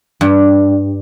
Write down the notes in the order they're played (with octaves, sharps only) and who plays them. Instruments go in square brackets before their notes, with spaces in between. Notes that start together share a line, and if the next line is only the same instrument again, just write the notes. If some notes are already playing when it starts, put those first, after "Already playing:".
[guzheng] G2